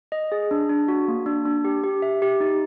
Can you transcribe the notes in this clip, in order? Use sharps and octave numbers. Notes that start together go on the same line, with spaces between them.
D#5
G#4
D4
D4
F#4
A#3
D4
D4
G4
G4
E5
G4
D#4